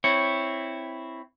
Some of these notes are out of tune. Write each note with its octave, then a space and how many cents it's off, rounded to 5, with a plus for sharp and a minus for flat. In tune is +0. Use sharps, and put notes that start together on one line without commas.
C4 +0 E4 +0 C#5 +0